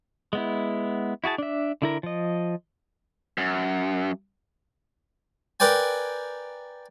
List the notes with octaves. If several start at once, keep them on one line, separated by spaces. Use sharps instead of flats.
G#3 B3 E4
E4 F#4 G#4 A5
D4 E5
D3 E4 A#4
F3 D#5
F#2
A#4 B4 D5 G5 G#5